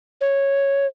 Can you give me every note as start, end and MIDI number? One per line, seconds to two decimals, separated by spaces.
0.21 0.87 73